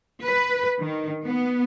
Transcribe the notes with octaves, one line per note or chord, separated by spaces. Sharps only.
B4
D#3
B3